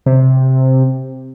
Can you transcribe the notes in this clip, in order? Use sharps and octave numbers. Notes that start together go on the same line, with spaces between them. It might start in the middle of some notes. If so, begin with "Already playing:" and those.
C3